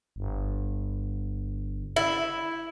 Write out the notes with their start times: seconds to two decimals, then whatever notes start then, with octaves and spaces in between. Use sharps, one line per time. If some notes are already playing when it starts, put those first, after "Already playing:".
0.16 G1
1.96 E4